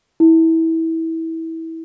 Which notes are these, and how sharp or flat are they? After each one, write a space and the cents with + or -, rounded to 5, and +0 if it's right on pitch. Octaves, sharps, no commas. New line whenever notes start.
E4 -25